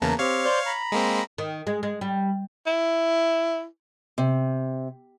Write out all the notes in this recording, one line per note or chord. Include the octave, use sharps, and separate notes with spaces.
E2 C#3 E3 A#3 A5 A#5
C4 G4 C#5 F5
C5 D5 G6
A#5 B5
G#3 A#3 C4
D#3
G#3
G#3
G3
E4
C3